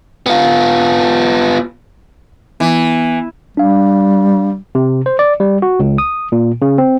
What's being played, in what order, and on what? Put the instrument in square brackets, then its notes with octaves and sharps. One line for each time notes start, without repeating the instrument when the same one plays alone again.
[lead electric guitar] B3 F4
[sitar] E3 [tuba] B3
[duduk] G3 [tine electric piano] D4 F5
[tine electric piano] C3
C5
D5
G3
F#4
C#2
D#6
A#2
C#3
C4